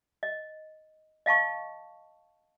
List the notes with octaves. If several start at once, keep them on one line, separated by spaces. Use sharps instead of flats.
D#5
D#5 F5 A5 C#6